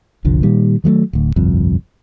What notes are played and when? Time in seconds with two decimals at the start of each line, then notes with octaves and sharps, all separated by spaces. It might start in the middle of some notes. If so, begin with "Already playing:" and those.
0.25 F#1 C2 D3 F3
0.43 A#2 D#3 G3
0.84 D#3 F#3 G#3 A3
1.13 D1 D2
1.36 G1 C2 F2